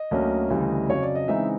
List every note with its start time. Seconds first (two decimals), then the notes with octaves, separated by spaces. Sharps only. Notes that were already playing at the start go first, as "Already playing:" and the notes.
Already playing: D#5
0.11 D2 D3 F#3 A#3 C#4
0.50 D2 C#3 E3 G3
0.89 F2 C#3 F#3 C#5
1.03 D5
1.15 D#5
1.28 C#3 E3 G#3 C4 D#4 E5